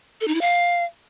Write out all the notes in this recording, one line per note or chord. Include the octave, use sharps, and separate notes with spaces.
A4
D#4
E4
F5